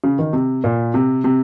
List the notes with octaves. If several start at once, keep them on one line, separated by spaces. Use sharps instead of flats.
C#3
D#3
C3
A#2
C3
C3